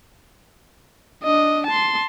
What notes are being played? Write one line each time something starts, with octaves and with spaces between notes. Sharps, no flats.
D4 D#5
A5 C6